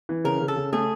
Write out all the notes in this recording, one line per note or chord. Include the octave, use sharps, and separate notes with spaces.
E3
C#3 A#4
C#3
A4
C#3
A3 G#4